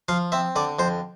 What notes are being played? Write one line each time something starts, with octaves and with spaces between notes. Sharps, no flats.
F3 F5
C4 E5
D3 D5
F2 C5